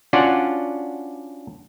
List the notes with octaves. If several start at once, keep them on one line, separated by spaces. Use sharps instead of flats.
C#4 D4 F4 F#4 D5 F#5